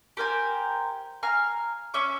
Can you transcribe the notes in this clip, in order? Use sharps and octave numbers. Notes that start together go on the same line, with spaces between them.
G4 A#4 C5 G#5
F5 G#5 A#5 F6
C#4 E5 D6